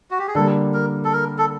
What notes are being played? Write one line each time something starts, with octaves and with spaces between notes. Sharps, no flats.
F#4
G4
G#4
D3 G3 A#3 A4
A#4
A4
A#4
A4